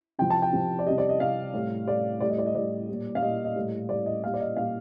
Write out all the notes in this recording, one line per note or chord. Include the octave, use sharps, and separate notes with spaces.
C3 F3 G5
A5
G5
C3 F3
D5
C3 G3 D#5
D5
D#5
C3 G3 F5
A2 G3
A2 G3 D5
A2 G3 D5
D#5
D5
D#5
A2 G3 D5
A#2 G3
F5
A#2 G3 D#5
D#5
A2 G3
A2 G3 D5
D#5
A#2 G3 F5
D5
D#5
A#2 G3 F5